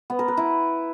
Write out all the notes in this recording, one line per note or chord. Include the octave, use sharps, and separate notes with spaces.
B3
A#4
B4
E4